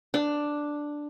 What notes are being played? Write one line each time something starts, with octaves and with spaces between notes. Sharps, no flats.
D4